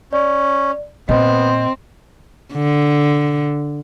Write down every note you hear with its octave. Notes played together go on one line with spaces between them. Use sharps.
C#4 D5
A#2 B3 C4 D#5
D3